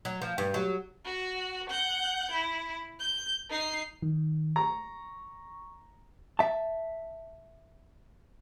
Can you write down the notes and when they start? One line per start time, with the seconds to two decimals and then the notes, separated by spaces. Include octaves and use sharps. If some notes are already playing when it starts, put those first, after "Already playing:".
0.05 F#3
0.22 F3
0.38 G2
0.54 F#3
1.05 F#4
1.70 F#5 G6
2.31 E4
3.00 G6
3.50 D#4 C7
4.02 D#3
4.56 A#5 C#6
6.39 E5 A5